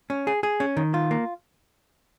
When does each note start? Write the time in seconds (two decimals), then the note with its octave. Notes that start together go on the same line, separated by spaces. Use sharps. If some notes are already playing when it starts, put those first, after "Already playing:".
0.10 C#4
0.27 G#4
0.43 G#4
0.60 C#4
0.77 D#3
0.94 F4
1.11 A#3